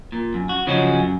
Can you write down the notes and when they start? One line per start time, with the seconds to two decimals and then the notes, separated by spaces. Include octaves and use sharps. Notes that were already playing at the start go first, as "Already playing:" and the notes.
0.12 A#2
0.34 F#2
0.49 F#4
0.67 C#3 F3 F#3 G#3 C#4 F#4
0.99 F#2